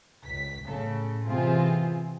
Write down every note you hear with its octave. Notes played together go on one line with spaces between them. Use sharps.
C#2 B6
A2 C#3 A4
C3 E3 C4 F4 G#4